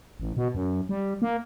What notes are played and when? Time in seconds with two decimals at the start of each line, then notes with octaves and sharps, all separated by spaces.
0.20 A1
0.37 B2
0.55 F#2
0.89 G3
1.22 A#3